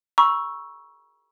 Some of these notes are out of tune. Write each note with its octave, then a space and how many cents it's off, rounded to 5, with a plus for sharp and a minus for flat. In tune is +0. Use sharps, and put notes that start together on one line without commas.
A#5 +45 C#6 +0 E6 +5